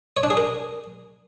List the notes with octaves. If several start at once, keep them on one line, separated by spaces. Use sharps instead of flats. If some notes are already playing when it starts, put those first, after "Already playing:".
C#5
D4
G#4
A#4